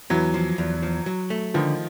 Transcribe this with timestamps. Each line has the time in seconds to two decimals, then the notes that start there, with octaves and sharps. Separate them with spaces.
0.10 E2 E3 F#3
0.34 F3
0.58 E2
0.82 F3
1.06 F#3
1.30 A3
1.54 D3 D#3 F3